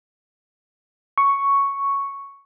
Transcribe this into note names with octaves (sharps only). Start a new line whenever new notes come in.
C#6